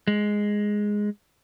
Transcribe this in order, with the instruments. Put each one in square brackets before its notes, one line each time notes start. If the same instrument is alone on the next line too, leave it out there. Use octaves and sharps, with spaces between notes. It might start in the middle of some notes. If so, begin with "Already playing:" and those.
[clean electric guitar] G#3